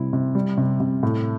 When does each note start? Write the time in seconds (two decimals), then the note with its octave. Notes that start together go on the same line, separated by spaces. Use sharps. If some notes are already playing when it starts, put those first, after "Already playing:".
Already playing: C3 G3 E4
0.13 C3
0.35 G3
0.58 C3
0.80 C3
1.03 A2